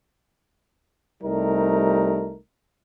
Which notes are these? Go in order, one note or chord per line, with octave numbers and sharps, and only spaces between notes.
C2 G3 A3 D#4 A#4